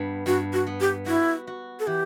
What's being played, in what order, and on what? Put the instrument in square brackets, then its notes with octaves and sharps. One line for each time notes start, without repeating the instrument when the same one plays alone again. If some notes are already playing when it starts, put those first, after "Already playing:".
Already playing: [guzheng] G2 B3
[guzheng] G2 [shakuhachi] F#4
[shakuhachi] F#4
[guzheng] B3
[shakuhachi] G4
[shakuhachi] E4 [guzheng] F#4
[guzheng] F#4
[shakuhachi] A4
[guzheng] E3 [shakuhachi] G4